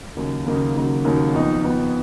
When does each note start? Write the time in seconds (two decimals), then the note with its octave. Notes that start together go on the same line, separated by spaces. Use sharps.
0.17 D#2 C#3 F#3 A#3 D#4
0.46 D#2 C#3 F#3 A#3 D#4
0.75 D#2 C#3 F#3 A#3 D#4
1.04 D#2 C#3 F#3 A#3 D#4
1.33 F2 F3 B3 D#4
1.63 F2 F3 B3 D#4